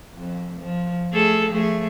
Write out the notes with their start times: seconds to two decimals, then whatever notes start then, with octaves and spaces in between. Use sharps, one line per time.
0.14 F2
0.60 F3
1.12 A3 G#4 A4
1.48 F3 A3 G#4